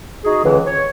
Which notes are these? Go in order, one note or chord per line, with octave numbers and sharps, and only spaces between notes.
D#4 F#4 G#4
C#2 D3 E3
C#5